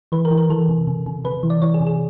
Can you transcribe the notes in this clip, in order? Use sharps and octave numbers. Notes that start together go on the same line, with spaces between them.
E3 B4
A#4
E3
A#4
E3 A4
C3
C3
C3
C3 B4
E3
D5
E3 C#5
G#4
C3
G#4